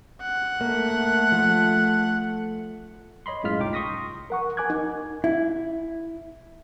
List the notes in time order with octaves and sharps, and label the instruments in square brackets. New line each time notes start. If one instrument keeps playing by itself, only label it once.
[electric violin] F#5
[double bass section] A3 [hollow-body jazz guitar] A#3
[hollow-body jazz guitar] F3
[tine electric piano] C#5 D#5 B5 C6
F#2 A2 G#3 F4 F6 B6
C2 D#4 G5 D6
C6 C#6 D#6 A#6 B6
[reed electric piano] A#4 F#5 C#6
A#4 G#5 D6 F#6 G#6
D#4
[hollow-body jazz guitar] E4